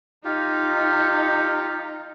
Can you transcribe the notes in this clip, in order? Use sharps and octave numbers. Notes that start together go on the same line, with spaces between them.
D#4 F4 G4